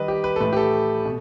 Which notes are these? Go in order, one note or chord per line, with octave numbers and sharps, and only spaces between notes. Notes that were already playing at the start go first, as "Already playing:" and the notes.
Already playing: D#3 G3 B4 D#5
G4
B4
A4
A2 E3 A3 B4
G4
A4
B2